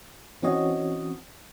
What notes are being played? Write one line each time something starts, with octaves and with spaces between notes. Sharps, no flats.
E3 C4 C#4 F#4 C#5 D#5